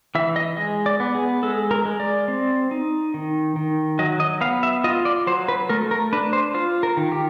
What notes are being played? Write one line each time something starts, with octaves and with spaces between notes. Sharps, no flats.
E3 E5
D#5
G#3 D#5
D5
B3
G#4
G#3 A4
A#4
G#3
D5
C4
D#4
D#3
D#3
F#3 D#5
D#5
B3 F5
E5
F4 D#5
D5
F#3 C5
B4
A3 A#4
A#4
D4 B4
C5
F4 C5
A#4
D#3
G4